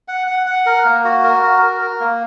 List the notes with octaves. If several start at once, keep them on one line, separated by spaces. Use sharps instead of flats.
F#5
F#5
F#5
A#4
A#3
F#4
A#4
F#4
A#4
A#4
A#3